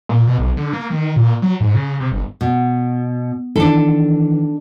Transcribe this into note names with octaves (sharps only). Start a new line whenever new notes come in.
A#2
B2
B1
D3
A#3
D#3
A#2
F#3
G#2
C#3
C3
G1
B2
D#3 E3 D4 A4